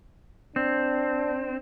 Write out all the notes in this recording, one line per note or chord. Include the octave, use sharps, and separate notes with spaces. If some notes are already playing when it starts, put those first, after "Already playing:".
C4 D4